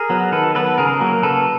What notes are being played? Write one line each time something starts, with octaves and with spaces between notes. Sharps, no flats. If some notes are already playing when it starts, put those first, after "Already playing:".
Already playing: G#4 A#4
F#3 B3
D#3 A4 B4
F#3 B3 A4 B4
C#3 G#4 A#4
F#3 A#3
C#3 A4 B4